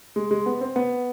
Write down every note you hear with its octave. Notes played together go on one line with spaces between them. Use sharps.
G#3
G#3
B3
C4
B3